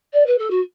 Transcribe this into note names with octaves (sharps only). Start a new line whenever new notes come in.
D5
B4
A4
F#4